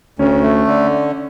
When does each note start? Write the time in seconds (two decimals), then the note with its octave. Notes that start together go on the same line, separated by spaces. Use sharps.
0.19 D2 C#4
0.43 A3
0.67 D3